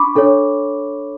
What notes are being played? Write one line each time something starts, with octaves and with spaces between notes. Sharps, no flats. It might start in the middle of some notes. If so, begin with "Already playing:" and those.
Already playing: D4 B5 C#6 D6
D4 A4 C#5